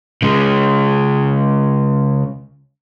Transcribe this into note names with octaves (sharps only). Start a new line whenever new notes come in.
C#3 G#3